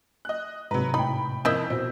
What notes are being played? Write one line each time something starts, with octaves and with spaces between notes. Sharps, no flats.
D#5 F#6
G#2 C3 F#3 B4 A#5
A2 D#4 G5 B5
F2 A#3 E4 D#5 E6 G6 B6
B2 C4